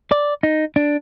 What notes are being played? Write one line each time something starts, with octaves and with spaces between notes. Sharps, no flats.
D5
D#4
D4